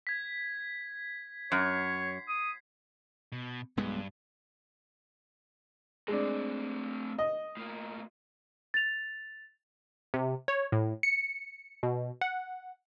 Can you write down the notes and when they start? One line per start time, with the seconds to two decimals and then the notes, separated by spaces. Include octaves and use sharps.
0.07 G#6 B6
1.52 F#2 C#5 C7
2.28 D#6
3.32 B2
3.77 B1 G2 G#3 B3
6.08 G#3 A3 C4 D4
7.19 D#5
7.57 A2 A#3
8.74 A6 F7
10.14 C3
10.48 C#5
10.72 A2
11.03 C#7
11.83 B2
12.21 F#5